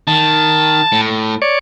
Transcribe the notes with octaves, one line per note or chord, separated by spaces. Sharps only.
D#3 A5
A2
C#5 D5